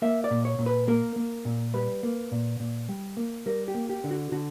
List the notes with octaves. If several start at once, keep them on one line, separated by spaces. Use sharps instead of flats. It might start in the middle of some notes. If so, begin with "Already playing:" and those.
A#3 E5
D5
A#2
C#5
A#2
B4
A#3 A#4
A#3
A#2
G3 B4
A#3
A#2
A#2
G3
A#3
G3 A#4
G4
A#3
G4
D3
F#4
D3 F#4